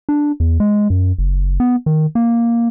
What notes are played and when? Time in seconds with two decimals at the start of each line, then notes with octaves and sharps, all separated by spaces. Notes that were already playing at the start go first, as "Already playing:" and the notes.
0.09 D4
0.40 E2
0.60 G#3
0.90 F#2
1.18 F#1
1.60 B3
1.86 D#3
2.15 A#3